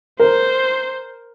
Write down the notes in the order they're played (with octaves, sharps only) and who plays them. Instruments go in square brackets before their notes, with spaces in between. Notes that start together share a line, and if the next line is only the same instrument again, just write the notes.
[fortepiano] A#4 [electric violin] C5